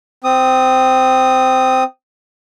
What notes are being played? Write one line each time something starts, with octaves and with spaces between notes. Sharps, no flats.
C4 D#6